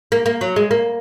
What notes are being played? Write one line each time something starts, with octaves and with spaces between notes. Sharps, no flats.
A#3
A#3
F#3
G#3
A#3